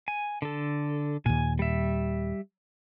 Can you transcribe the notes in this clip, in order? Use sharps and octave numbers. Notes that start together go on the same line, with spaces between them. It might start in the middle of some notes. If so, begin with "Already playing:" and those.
G#5
D3 A4
D#2 A#2 G#5
G3 E5